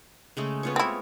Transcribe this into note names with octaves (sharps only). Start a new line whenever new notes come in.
C#3 G#3 A3
B3 F4 C#5
C4 E4